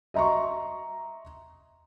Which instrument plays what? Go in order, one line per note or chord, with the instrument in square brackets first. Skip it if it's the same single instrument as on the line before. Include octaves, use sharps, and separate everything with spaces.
[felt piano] D#5 E5 A#5 C6 C#6